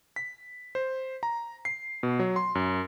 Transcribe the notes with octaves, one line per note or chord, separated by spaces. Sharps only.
B6
C5
A#5
C7
B2
F#3
C6
F#2